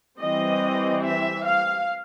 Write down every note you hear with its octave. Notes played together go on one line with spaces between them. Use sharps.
E3 G3 C4 D#5
E5
F5